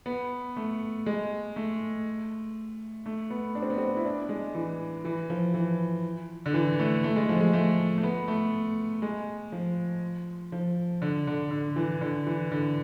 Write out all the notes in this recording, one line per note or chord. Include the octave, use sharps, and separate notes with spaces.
B3
A3
G#3
A3
A3
B3
D4
C4
B3
C4
E4
D4
G#3
E3
E3
F3
E3
D3
E3
A3
A3
G#3
F3
G#3
A3
A3
B3
A3
G#3
F3
F3
D3
D3
D3
E3
D3
E3
D3